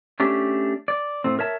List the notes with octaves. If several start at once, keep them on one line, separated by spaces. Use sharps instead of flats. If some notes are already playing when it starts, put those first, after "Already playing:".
A3 C#4 D4 G4
D5
A2 A3 C4
A#4 C#5 E5 A5